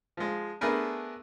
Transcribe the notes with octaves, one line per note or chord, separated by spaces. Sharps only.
F3 G#3
A3 B3 D4 G#4 A#4 B4